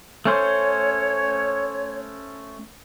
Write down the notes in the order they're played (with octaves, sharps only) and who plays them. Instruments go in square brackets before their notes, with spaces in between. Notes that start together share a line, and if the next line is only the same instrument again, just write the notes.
[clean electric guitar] A3 C#4 C5 [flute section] C#5